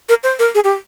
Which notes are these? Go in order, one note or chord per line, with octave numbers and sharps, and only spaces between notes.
A#4
C5
A#4
G#4
G4